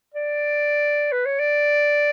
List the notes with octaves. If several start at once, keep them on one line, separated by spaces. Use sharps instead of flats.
D5
B4
C#5
D5